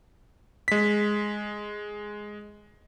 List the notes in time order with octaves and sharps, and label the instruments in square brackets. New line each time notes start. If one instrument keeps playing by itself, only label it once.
[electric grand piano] G#3 B6